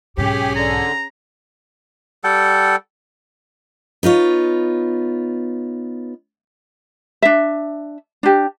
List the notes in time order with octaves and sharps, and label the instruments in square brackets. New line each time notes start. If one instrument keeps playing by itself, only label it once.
[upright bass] B1 G#2 [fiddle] C#4 G#4 [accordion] G4
[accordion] D3 [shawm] A#5
[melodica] G3 A4 F#5 G5
[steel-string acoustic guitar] B3 D#4 F4 C#5
[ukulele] D4 E5
D4 G4